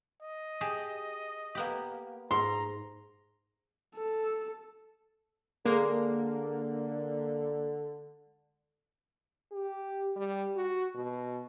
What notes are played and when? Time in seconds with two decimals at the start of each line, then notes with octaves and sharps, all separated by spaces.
0.22 D#5
0.61 G4 G#4 A5
1.55 A#3 B3 G4
2.31 G#2 A#5 C6
3.96 A4
5.65 D3 G#3 A#3
9.52 G4
10.16 G3
10.56 F#4
10.95 B2